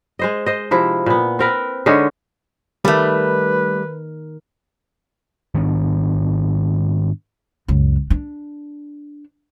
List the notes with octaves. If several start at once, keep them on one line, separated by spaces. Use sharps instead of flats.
G#3 C5 D#5
C5 D#5
C3 F3 E4
A#2 B3
C4 A#4 B4
D3 G#3 C#4 D#4
D#3 G3 A3 A#4 B4
G#2 D#3 B3 D4
C#2 F#2
D4